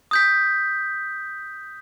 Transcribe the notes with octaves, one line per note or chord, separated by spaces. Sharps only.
D#6 G6 B6